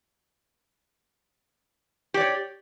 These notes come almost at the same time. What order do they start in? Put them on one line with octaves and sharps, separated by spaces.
G4 D5 C#5